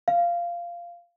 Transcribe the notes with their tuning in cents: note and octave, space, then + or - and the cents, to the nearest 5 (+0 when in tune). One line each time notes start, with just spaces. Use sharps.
F5 -10